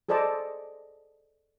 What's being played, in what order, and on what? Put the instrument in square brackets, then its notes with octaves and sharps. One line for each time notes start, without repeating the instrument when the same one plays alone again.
[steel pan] G#4 A4 C5 D5 D#5 A5